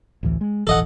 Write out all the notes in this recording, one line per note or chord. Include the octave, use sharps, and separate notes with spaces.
A1 D2 E3
G#3
E1 A1 E3 A4 D#5 F#5